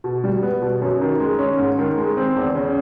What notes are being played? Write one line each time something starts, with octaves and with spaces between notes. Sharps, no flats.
B2
G3
B3
B2
F#2
D#3
G#3
C#4
G#2
D#3
G#3
C4
E2
C#3